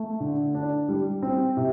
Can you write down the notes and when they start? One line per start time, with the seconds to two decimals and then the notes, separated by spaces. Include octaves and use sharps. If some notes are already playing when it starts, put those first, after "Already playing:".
Already playing: A3
0.20 D3
0.55 D4
0.89 G3
1.22 C4
1.57 C3